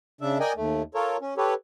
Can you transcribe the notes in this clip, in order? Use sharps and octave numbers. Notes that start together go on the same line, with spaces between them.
C#3 D4 E5
A#4 D5 D#5 G5 G#5
D#2 A3
F4 A4 A#4 C#5
C#4
G4 A4 B4 C#5